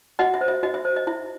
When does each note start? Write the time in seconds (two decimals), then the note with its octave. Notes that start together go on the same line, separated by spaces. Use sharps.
0.19 F#4 D#5 F#5
0.34 E5
0.41 C5
0.48 E5
0.63 F#4 D#5
0.74 E5
0.85 C5
0.96 D#5
1.07 E4 E5